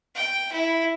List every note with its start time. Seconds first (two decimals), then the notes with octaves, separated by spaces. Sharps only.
0.15 G5
0.52 E4